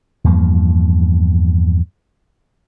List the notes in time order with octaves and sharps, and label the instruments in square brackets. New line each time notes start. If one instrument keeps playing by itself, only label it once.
[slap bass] E2 G2 F3 A#3